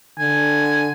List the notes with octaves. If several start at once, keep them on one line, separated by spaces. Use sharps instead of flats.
D3 G#5